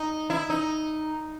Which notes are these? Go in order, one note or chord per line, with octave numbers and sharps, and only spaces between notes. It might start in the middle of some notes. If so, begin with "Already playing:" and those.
Already playing: D#4
E4
D#4